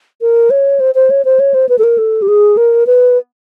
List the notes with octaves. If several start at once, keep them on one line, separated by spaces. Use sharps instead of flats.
A#4
C#5
C5
C5
C#5
C5
C#5
C5
B4
A4
A#4
A4
G4
G#4
A#4
B4